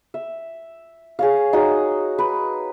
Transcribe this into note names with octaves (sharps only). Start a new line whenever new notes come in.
E5
G#4 C#5 F5
D#4 F#4 G#4 C#5
B4